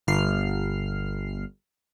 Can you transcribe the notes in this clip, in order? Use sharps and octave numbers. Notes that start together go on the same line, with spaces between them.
G1 F6 C7